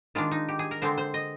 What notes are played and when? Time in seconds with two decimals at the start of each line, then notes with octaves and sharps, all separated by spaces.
0.15 D#3 G#3 D4 F4
0.31 D#4
0.49 G4
0.59 G#4
0.71 A#4
0.82 D3 G#3 C4 C5
0.98 C5
1.14 D#5